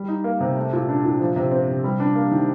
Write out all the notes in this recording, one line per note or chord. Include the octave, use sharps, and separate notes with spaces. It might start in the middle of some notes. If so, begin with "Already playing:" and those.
Already playing: G3
D#4
A#3
C3
A3
A#2
D4
A#2
F3
C3
C4
C3
G3
D4
A#3
D#3